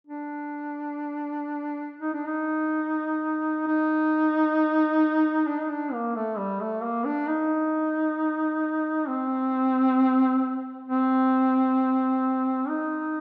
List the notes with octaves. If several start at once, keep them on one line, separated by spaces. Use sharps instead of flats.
D4
D#4
D4
D#4
D#4
D4
D#4
D4
A#3
A3
G3
A3
A#3
D4
D#4
C4
C4
D#4